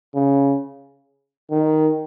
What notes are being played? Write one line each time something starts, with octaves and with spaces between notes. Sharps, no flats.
C#3
D#3